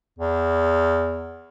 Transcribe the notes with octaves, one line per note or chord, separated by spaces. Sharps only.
E2